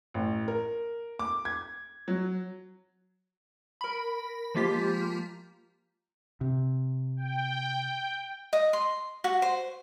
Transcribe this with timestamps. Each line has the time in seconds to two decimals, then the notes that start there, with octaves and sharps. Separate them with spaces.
0.14 A1
0.48 A#4
1.19 D6
1.45 G#6
2.08 F#3
3.81 A#4 B5
4.55 F3 G#3 A#3 F4 G4 B6
6.41 C3
7.17 G5
8.53 D#5
8.73 C6
9.24 F#4
9.42 C5